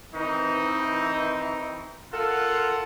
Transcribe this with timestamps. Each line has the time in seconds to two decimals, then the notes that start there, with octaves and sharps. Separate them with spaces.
0.14 D#3 E3 C4 D#4
2.13 F4 A4 A#4 F#5